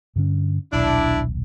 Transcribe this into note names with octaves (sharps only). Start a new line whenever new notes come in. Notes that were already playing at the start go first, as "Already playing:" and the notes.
G2 D3 C#4
D#1 B1 D4 E4